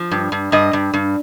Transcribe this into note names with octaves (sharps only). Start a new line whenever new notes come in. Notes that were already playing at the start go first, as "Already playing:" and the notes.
Already playing: F3
G2
G2
G2 D#5
G2
G2